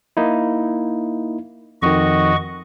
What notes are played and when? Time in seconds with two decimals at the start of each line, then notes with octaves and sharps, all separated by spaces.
0.17 A#3 D#4 E4
1.82 F2 D#3 F#4 D#5 C#6